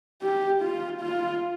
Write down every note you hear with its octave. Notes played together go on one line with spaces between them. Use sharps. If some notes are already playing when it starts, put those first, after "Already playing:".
G4
F4
F4